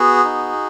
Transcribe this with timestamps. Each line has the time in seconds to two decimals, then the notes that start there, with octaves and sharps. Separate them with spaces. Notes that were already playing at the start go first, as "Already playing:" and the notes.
Already playing: B3 F#4 G#4
0.24 D#4